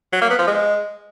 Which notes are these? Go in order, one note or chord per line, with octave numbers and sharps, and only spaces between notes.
F#3
A#3
B3
F3
G#3